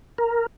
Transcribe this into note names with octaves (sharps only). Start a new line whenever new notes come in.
A#4